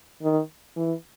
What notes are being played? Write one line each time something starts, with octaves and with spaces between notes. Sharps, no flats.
D#3
E3